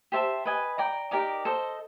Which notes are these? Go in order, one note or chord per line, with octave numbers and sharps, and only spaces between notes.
G4 C5 E5 A5
B4 D#5 G#5
D5 G5 A#5
D#4 G4 A#4 D5
A4 C5 D#5